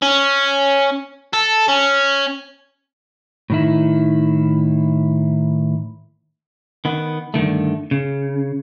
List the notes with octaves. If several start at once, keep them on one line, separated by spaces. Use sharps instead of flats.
C#4
A4
C#4
A2 D#3 E4
D#3 B3
G2 D3 D#3 A3
C#3